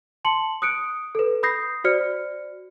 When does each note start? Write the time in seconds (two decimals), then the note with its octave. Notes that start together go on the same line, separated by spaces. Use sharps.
0.25 A5 C6 C#7 F#7
0.62 D#6 F#6 C#7 D7
1.15 A4 B4
1.43 B5 D#6 G6 A#6 C7
1.84 F#4 C5 D5 F6 C#7